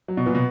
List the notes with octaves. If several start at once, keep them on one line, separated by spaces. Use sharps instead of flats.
F#3
B2
A#2 B3
B2